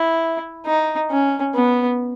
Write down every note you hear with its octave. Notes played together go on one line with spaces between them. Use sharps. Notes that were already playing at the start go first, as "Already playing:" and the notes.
Already playing: E4
D#4
C#4
B3